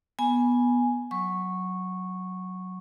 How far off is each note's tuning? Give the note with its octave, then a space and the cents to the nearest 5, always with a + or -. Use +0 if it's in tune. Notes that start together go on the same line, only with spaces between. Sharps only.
B3 -10 G#5 +0
F#3 +0 C#6 -10